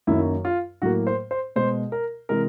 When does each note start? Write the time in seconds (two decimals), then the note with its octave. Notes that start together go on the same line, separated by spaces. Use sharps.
0.07 F#2 D#3 F#3 A#3 E4
0.45 F4
0.82 A2 F#3 A#3 F#4
1.07 C5
1.31 C5
1.56 B2 G#3 C5
1.92 A#4
2.29 C3 E3 G#3 A#4